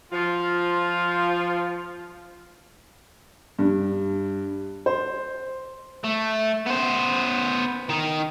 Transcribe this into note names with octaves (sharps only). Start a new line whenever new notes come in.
F3 F4
G2
C5
A3
B3 C5
D#3 D#4